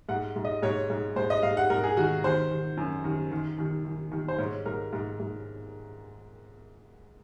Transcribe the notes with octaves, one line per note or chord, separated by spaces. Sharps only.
G#2 F#5
G#2
D#5
G#2 C#5
G#2
G#2 C5
D#5
G#2 F5
F#5
G#2 A#4
G#4
D#3 F#4
D#3 C5
D#3
F#2
D#3
D#3
D#3
D#3
D#3
C5
G#2 C#5
G#2 A#4
G#2
G#2